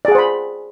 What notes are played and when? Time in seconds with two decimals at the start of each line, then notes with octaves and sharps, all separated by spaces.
0.05 D5
0.08 G#4
0.12 F#5
0.15 C5
0.18 B5